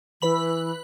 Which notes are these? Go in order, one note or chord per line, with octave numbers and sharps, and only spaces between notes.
E3 B4 B5 F#7